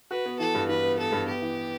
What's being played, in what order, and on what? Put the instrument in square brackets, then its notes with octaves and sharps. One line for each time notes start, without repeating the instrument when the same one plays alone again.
[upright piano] F#4 [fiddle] B4
[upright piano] B3
[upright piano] E3 [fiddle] A4
[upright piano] G2
[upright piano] E3 [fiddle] B4
[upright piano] B3
[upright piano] B3 [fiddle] A4
[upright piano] G2
[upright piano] B3 [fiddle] G4
[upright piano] E3